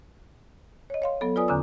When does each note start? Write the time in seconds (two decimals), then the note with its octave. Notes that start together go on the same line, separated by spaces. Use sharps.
0.90 C#5 D#5
1.02 C#5 F5 C6
1.21 F#3 B3 A4
1.36 F4 B4 D5 G#5 D#6
1.48 E2 D3 C#4 A#5 D6 E6